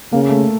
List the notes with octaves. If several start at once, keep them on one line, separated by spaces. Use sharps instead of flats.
C#3 A#3
A3